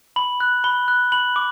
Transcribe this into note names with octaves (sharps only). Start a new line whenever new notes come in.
B5 F#7
F#6
B5 G7
F#6
B5 F#7
D6